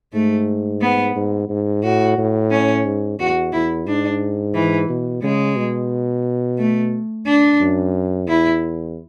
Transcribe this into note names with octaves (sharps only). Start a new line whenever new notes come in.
G#2 A3
B3
G#2
G#2
A2 F#4
A2
C#4
G#2
E2 F#4
E2 E4
G#2 D4
E3
B2
C#3 G#3
B2
A3
D4
F#2
E2 E4